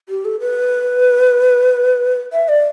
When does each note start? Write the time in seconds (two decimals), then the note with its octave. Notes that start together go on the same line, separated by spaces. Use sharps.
0.09 G4
0.25 A4
0.40 B4
2.33 E5
2.49 D5